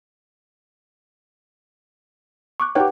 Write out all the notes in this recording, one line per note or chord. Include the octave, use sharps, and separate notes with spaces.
C#6 D6 F#6
D#4 G4 B4 C#5 F#5 G5